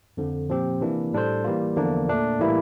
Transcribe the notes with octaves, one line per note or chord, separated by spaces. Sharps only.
F2 D3 F3
A#2 F3 C4 G4
C3 E3 A#3 D4
A2 G3 D4 A4 C5
E3 G3 A#3 F4
E2 D3 F3 A#3 D4
A#2 A3 D4
A2 E3 G3 A#3 E4